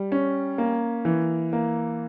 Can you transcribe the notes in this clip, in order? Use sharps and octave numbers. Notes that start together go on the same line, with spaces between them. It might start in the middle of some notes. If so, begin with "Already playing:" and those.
Already playing: G3
C#4
A#3
E3
A#3